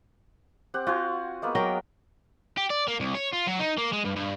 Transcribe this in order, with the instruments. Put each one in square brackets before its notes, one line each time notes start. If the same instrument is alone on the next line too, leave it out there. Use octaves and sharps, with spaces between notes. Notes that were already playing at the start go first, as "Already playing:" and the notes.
[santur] C4 G4 F#5
[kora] F4 [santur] F#4 C5 G#5
[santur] G#3 A#3 B3
[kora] F#3 A#4 G5 [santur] C#5
[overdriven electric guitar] G4
D5
A#3
C2
C#5
F4
F#3
D#4
A#3
G#3
G2
G2